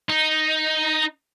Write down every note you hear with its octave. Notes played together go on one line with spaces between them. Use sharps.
D#4